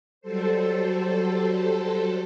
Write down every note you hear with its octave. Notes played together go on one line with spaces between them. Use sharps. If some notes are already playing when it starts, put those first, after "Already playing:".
F#3 G3 A4 C5